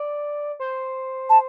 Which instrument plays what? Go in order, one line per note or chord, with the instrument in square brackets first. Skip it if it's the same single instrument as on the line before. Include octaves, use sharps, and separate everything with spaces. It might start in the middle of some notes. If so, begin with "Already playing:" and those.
Already playing: [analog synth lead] D5
C5
[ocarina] A5